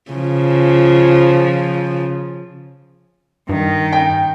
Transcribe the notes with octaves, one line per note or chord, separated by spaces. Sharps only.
C#3 F3
G2 D#3
G5